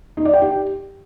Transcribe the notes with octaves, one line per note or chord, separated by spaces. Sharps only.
D#4
D5
G5
G4